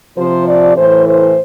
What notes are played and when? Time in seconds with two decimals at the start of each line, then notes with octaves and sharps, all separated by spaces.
0.17 C3 F3 C5
0.47 D5
0.76 A2 E3 C5
1.07 C5